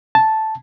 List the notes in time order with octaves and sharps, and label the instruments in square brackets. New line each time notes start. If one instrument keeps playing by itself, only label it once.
[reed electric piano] A5